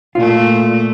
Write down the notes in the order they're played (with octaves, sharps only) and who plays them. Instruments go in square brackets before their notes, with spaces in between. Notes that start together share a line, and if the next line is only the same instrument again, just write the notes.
[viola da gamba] A#2 A3 [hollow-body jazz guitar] F4